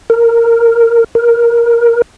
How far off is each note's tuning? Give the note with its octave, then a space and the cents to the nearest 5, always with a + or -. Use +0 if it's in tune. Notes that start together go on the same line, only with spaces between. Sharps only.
A#4 -10
A#4 +10